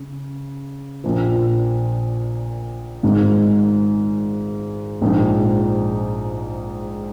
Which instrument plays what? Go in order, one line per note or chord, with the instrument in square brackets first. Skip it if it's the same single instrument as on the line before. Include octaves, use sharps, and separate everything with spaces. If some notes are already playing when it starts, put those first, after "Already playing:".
Already playing: [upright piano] C#3
A#1 A#2 F3
G#1 G#2 D#3
A#1 G#2 F3 G#3 D#4